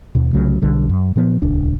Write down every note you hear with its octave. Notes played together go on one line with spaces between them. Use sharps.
D#2 B2
C2 C#3 F#3 A3
B1 D3 G3
F#2
A#2 F3 B3
D#1 C#2 D4